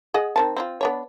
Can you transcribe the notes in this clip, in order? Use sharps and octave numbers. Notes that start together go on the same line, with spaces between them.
G#4 D#5 F#5
D#3 C4 A5
C4 E4 F4
B3 D4 C#5